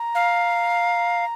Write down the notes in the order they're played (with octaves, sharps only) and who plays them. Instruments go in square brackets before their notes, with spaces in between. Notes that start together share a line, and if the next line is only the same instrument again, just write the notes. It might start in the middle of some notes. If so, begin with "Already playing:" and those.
Already playing: [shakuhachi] A#5
[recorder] F5